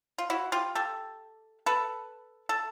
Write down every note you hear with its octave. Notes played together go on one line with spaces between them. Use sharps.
F4
E4 F#4
F4 G4
G4 A4
A4 B4
A4